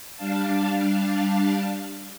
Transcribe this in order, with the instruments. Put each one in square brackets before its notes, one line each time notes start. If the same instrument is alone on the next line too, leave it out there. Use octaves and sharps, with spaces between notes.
[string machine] G3 D4 F5 A5